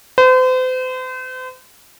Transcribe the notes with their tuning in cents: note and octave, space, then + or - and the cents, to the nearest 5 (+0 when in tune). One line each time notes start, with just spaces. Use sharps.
C5 -40